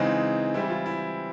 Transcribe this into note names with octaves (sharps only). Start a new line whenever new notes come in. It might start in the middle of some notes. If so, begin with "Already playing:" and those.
Already playing: C#3 E3 G#3 C4 D#4
E3 G3 C4 E4
F4
E4